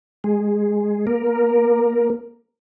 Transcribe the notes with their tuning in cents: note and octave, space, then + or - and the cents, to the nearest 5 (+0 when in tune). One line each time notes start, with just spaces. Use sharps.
G#3 -5 G#4 +0
A#3 +20 A#4 +0